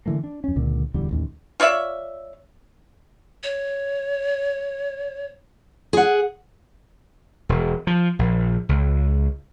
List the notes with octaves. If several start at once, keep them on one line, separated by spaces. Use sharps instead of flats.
D3 E3 A3 A#3
D4
F2 C#4
C#2 A#2 D3
D1 E2 D3 G3
A1 D#2
F4 C#5 D5 E5
C#5
G#4 F#5
E1
F3
A#1
C#2